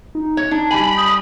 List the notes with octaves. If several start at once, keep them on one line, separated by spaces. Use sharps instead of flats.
D#4
C#5
D4 D#4
G3 G#5 B5
D#6 G6